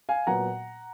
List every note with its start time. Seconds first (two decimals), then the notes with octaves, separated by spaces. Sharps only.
0.09 F5 G#5
0.27 A#2 F#3 B3 F#5 A#5